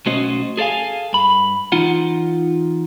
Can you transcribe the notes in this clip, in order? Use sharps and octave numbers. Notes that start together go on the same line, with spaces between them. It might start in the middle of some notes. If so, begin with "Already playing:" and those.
B1 A3 C#4 F#4 C5 D#5
G#4 A4 D5 F5 G#5
G2 B5
E3 D#4 F4 F#5